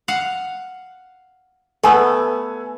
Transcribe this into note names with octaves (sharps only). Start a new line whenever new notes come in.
F5 F#5
A3 B3 A4 B4 G#5